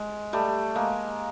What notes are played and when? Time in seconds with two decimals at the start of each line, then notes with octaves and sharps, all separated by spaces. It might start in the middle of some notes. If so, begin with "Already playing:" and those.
Already playing: G#3
0.33 G3 A3
0.75 G#3 A#3